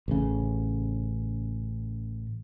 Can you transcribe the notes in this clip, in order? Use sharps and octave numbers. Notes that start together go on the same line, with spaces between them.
A1 C#3